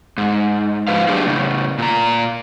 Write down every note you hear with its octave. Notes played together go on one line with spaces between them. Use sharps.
G#2
G#2 F3 B4 C5 F5
F#3 A3 D4 G4 G#4
A2 C#3
A#2 A#5